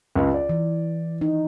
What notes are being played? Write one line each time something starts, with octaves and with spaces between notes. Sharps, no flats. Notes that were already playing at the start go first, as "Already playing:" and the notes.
C#2
D5
E3
D#4